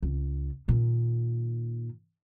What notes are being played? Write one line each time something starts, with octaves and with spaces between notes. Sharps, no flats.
C#2
A#2 D#3